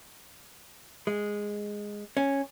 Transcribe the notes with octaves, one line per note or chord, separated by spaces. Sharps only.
G#3
C#4